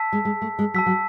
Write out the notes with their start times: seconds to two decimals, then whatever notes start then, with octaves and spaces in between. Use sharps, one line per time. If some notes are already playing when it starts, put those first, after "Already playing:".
Already playing: A5 E6 B6
0.12 G#3
0.25 G#3
0.42 A3
0.59 G#3
0.74 F#3 A5 E6 B6
0.86 F#3